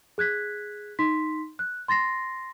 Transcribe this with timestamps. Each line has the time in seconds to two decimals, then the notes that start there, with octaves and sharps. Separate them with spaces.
0.18 G#4 F#6 G#6 B6
0.99 D#4 C6 B6
1.59 F#6
1.88 C6 A6 A#6 C7